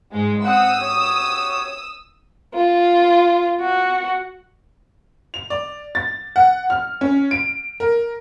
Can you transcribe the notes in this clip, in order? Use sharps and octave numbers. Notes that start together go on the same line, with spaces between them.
G#2 G#3
C4 F#5 D#6 E6
F#4 G4 C#5
F4
F#4
F7
D5
A6
F#5
F6
C#4
D7
A#4